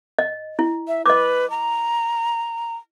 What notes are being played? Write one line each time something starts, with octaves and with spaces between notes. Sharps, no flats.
D#5
E4
E5
B4 D#5 D6
A#5